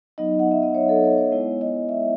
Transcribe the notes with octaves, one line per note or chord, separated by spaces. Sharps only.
F#3 B3 D#4 D#5
F#5
E5
D#5
C#5
A4
C#5
C#5
G#3 B3 E4
D#5
E5